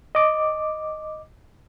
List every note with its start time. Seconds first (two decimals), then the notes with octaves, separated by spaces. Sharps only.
0.15 D#5 D6